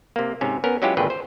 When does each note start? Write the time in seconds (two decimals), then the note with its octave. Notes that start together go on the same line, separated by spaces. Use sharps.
0.16 C3 A#3
0.41 G#2 C3 C#4
0.64 B3 C#4 A#4
0.82 F#3 G#3 C#4 E4 F4 G4
0.97 G#1 A#2 D3 G#4 B4 G5
1.10 C5